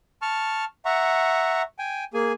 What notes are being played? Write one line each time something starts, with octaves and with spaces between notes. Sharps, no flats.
A5 C#6 F6
E5 F#5 A#5 C#6
G5 G#5
A#3 G#4 G#5